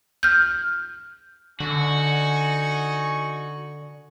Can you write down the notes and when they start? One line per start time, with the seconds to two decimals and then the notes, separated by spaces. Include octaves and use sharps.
0.23 F6 G6
1.60 D3 D#4 F#4 G#5 C#6